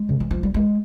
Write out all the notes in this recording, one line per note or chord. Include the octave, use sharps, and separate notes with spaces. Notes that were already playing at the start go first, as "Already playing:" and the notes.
Already playing: G#3
C#3
E3
F3
G3
G#3